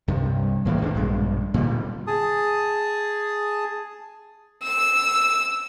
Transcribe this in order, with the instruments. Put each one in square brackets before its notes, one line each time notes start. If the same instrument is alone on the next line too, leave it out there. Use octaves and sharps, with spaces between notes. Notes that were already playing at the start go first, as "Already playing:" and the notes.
[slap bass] C2 G2 C3
D1 A2 E3 A#3
C#2 D3 D4
A#1 G2 B2 G#3
A#2 D3 F#3 G3
[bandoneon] G#4 A5 D#6
[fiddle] E6